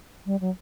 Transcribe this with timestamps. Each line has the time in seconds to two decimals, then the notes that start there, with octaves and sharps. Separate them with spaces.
0.26 G3
0.40 F#3